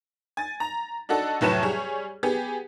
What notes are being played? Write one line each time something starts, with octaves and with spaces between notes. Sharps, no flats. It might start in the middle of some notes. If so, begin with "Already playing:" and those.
G#5 A6
A#5
D4 D#4 F#4 A4
F1 A2 F#3 B4 A5 E7
G3 G#4 C#5
B3 G4 G#4